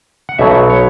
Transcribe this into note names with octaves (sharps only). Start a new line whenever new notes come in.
F#5
B1 B2 F#3 E5
C#5